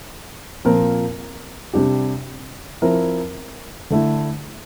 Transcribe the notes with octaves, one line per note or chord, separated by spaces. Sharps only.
A#2 F3 C4 F4 A#4
C3 G3 D4 G4
F3 C4 E4 A#4
D3 A3 E4